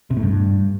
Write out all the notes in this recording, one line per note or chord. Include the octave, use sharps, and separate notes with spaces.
C3
A2
G2